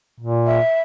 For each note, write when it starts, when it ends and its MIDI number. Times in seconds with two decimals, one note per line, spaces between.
0.20 0.59 46
0.46 0.82 76